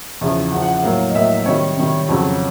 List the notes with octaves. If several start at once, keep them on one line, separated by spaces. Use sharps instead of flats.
E2 C#3 F3 E5
E2 C#3 F3 F#5
F#5
F#5
A2 F#3 A#3 F5
D#5
A2 F#3 A#3 E5
C3 D#3 G3 C#5
C3 D#3 G3
F2 C#3 F#3